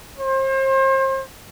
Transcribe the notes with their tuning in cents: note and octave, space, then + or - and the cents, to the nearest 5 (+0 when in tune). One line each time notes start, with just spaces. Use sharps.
C5 +35